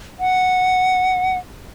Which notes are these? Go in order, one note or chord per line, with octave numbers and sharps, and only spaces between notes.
F#5